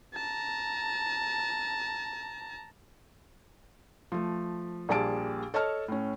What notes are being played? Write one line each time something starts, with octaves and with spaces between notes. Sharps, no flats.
A5 A#5
F3 A3
A#1 A#2 G3 G#4 A5 D7
A4 C#5 D#5 A5 F6
A2 C#4